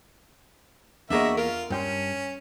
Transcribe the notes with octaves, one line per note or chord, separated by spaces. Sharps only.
E2 A#3 D4 F#4 G#4 A#4 D#5 E5
F4 A#4
G2 C#4 G5 C6